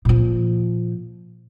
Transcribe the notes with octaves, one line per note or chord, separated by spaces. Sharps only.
A#2 F3